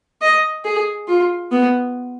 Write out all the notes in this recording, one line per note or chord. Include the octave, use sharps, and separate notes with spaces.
D#5
G#4
F4
B3